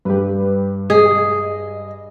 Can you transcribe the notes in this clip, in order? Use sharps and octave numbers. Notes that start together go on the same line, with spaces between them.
G2 G4 B4
G#4 D#5